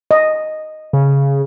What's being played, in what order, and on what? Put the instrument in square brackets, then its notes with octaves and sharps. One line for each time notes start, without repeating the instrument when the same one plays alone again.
[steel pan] D#5
[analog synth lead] C#3